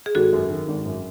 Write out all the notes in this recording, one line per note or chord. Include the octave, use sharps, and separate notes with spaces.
G#4
G#1 F#4 A4
F#2
D#3
G#1
F#2